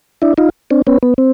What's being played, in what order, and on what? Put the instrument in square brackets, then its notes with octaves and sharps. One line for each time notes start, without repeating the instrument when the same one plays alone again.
[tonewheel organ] D4 E4
D#4 F4
C4 D4
B3 C#4
B3
C4